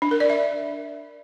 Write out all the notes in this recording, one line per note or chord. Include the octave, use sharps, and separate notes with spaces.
D4
A#4
D5
E5